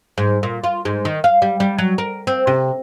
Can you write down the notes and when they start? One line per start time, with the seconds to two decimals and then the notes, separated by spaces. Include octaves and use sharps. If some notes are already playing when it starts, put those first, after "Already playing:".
0.18 G#2
0.43 A#2
0.64 F4
0.85 G#2
1.05 D#3
1.24 F5
1.42 G3
1.60 G3
1.78 F#3
1.98 A#4
2.27 C4
2.47 C3